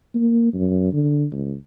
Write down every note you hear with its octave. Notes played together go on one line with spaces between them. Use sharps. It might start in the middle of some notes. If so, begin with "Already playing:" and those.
A#3
F#2
D3
C#2